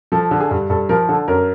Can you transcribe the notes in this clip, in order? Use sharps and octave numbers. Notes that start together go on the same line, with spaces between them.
F3 A4
D3
G#4
G2
G2 A4
F3 A#4
D3 A4
F#2 A#4